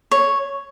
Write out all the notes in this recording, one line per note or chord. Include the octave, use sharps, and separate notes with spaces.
C#5